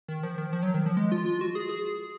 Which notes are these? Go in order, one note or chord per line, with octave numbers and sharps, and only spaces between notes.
D#3
F3
D#3
F3
F#3
D#3
F3
G#3
F4
F4
F#4
G#4
G#4